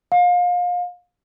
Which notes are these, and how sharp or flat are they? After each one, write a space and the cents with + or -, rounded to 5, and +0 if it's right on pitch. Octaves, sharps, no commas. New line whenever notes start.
F5 +30